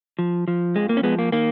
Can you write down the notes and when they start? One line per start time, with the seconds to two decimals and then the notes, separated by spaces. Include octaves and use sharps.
0.19 F3
0.48 F3
0.75 F2 G#3
0.89 A#3
0.97 C#4
1.03 F3 G#3 B3
1.19 A#3
1.32 D#3 A#3